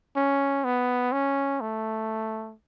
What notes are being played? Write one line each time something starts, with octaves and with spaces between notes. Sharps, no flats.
C#4
B3
C#4
A3